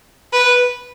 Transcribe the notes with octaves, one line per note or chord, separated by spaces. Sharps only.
B4